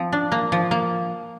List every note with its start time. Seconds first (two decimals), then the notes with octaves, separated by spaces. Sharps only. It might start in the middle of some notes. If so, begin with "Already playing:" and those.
Already playing: F3 C4
0.12 D4
0.32 A#3
0.52 F3
0.71 A#3